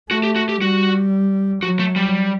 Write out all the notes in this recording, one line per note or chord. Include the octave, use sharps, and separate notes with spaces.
A3 F#4
G4
F#4
G4
G3 F#4
F#3 F#4
A3
G3